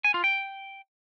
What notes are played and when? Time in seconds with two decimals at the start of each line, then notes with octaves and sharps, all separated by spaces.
0.04 G#5
0.14 F4
0.24 G5